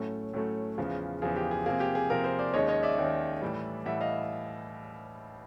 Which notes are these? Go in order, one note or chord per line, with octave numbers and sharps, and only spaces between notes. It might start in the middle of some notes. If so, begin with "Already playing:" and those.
Already playing: A2 F#3 A3 C#4
A2 F#3 A3 C#4
E2 C#3 F3
E2 C#3 F3 G#4
G4
G#4
C3 F3 A#3 G#4
G4
G#4
C3 F3 A#3 G#4 A#4
A#4 C5
C5 D5
D#2 D#3 G#3 C#4 C#5 D#5
C#5 D#5
D5 E5
D#2 D#3 G#3 C#4
A2 E3 G3
A2 E3 G3 E5 F#5
D#5 F5